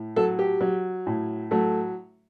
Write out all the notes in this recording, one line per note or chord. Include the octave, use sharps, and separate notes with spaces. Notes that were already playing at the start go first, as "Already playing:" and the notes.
Already playing: A2
F#3 A4
G4
F#3
A2
F#3 A3